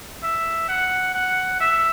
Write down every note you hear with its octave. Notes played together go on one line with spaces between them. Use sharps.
E5
F#5
F#5
E5